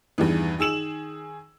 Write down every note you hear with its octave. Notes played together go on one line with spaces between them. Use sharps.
E2 G2 D#3 E3
D#3 G#4 E6 E7 F#7